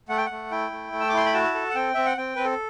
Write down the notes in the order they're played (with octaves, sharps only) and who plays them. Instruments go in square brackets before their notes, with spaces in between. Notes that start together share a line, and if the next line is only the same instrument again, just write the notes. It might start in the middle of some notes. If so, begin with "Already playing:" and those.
[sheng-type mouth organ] A3 F#5
G5
A3 F#5
E4 G5
A3
A3
E6
D6
E4 C6
B5
F#4 A5
A4
F#5
C4 G5
C4 E5
F#5
C4 G5
C4 B4
A4